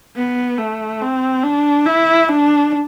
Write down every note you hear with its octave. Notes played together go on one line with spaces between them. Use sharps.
B3
A3
C4
D4
E4
D4